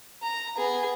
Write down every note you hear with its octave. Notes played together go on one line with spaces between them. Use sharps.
A#5
B3 G#4